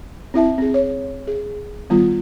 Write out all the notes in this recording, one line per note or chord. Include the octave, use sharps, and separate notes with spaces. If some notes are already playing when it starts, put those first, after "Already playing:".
C4 E4 E5 A5
C4 G#4
C#5
G#4
D#3 G3 B3 F4